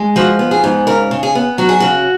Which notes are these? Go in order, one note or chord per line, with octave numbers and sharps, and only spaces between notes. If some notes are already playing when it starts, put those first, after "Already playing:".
Already playing: G#3
F3 F#4
B3
G#4
G#2
C#3 A#4
C#3
G#4
B3
F#3 F#4
G#4
C#3 F#4